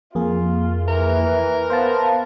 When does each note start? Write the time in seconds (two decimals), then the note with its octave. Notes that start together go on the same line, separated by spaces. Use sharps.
0.15 F2 A#3 F4 G#4
0.88 E3 A#4
1.70 B3 C5 F5 A5